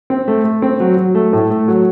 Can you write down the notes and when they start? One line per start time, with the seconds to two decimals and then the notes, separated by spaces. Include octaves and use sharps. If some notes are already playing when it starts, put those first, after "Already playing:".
0.10 C4
0.28 A3
0.44 A3
0.62 C4
0.80 F#3
0.97 F#3
1.15 A3
1.33 A2
1.50 A3
1.68 F#3